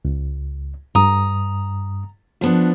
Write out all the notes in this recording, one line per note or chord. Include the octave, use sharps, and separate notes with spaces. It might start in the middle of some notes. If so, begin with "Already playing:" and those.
C#2
G2 A#5 D#6
F3 B3 D4